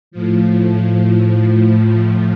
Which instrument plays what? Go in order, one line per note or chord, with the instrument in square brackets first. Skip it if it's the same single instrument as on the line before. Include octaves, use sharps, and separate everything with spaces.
[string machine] A2 F3